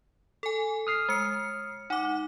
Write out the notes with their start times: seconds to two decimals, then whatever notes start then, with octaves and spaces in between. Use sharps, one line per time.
0.43 A4 G#5
0.87 D#6 F6 C7
1.09 G#3 C#7
1.90 D#4 F#5 D6